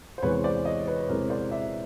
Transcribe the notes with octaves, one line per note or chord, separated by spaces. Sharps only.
C5
E2 C3 E3 G#3 C4 B4 C#5
C5 D5
C#5 D#5
B4 C#5
B4
E2 C3 E3 G#3 C4 A#4 C5
C5 D5
D5 E5